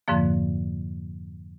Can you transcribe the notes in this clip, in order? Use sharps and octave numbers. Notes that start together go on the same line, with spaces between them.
F2 G#2 D3 F3 A#3